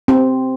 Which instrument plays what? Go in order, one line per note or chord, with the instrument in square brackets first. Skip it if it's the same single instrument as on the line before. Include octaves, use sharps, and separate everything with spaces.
[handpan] C4